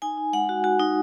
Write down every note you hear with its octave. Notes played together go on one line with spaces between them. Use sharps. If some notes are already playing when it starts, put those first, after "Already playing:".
D#4 G#5
D#4
G#3 F#5
F#4
F#4
D#4